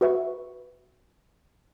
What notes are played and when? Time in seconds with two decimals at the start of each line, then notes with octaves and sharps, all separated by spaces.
0.01 F#4 B4 E5 C#6